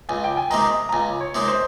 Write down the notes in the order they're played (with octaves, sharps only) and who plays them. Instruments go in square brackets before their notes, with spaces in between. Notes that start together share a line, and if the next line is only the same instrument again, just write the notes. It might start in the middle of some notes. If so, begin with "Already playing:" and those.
[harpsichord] C#2 [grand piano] G#5
[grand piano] G5
G#5
[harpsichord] C3 D#3 G#3 [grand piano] A#5
[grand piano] A#5
[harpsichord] C#2 [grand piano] G#5
[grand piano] C#5
[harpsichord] C3 D#3 G#3
[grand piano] C5